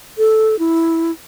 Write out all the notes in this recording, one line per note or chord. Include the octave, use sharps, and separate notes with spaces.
A4
E4